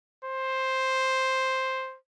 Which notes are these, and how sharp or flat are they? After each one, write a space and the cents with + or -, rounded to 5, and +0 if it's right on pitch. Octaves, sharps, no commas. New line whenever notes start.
C5 +5